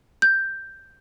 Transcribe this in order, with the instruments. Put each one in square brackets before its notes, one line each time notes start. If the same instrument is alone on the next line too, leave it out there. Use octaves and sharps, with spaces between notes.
[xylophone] G6